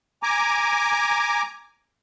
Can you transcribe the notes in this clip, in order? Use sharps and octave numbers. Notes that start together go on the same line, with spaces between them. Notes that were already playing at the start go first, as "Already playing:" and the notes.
G#5 A#5 D6